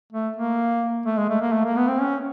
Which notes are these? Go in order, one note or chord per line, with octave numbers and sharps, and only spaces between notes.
A3
A#3
A3
G#3
A3
A#3
A3
A#3
B3
C4
C#4